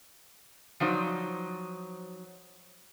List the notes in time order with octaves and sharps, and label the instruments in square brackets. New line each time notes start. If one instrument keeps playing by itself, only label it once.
[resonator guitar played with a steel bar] F3 F#3 D#4 C5 D5